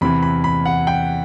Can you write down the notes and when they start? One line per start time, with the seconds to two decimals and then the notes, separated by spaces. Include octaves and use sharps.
0.01 E2 C3 E3 B5
0.22 B5
0.44 B5
0.66 F#5
0.87 G5